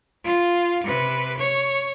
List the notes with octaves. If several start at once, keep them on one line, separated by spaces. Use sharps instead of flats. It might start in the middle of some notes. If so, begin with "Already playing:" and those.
F4
C3 B4
C#5